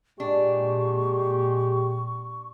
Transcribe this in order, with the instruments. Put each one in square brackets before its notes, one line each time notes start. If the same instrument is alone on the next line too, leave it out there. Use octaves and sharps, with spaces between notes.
[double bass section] A#2 [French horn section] G#3 G4 [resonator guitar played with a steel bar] D4 [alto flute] C#6